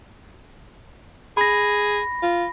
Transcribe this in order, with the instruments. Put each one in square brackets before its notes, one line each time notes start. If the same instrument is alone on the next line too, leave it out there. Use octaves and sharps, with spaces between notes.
[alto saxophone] G#4 [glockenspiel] B5 A#6
[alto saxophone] F4